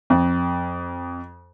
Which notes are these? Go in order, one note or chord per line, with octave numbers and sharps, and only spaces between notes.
F2